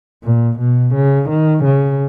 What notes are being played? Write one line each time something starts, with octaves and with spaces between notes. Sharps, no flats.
A#2
B2
C#3
D#3
C#3